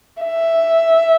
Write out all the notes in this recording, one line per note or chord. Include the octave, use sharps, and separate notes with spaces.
E5